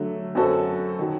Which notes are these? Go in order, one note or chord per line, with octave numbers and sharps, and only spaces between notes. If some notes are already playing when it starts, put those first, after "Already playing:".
Already playing: D3 F#3 A3
F#2 F#3 C4 F#4 A4
D#3 F#3